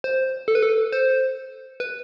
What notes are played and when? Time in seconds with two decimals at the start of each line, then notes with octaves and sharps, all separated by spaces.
0.04 C5
0.48 A4
0.55 B4
0.62 A4
0.92 C5
1.80 B4